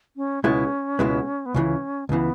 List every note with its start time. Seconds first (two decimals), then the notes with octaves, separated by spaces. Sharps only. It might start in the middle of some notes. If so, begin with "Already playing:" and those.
0.17 C#4
0.44 C#2 B2 G#3 B3 C#4 E4
0.99 C#2 B2 G#3 B3 E4
1.46 B3
1.54 C#2 C#3 E3 C#4
2.09 C#2 C#3 E3 B3